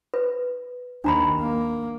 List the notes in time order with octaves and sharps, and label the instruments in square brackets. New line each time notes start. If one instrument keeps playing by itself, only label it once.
[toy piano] B4
[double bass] D#2 [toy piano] D4 A#5 B5
[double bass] A#3